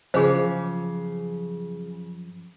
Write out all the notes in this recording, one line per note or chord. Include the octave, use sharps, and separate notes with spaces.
F#2 C#3 F3 G#4 C5